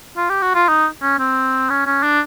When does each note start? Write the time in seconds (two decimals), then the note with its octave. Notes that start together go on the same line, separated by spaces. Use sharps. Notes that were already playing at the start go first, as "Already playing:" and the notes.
0.17 F4
0.29 G4
0.42 F#4
0.55 F4
0.68 D#4
1.02 C#4
1.19 C4
1.70 C#4
1.86 C#4
2.03 D4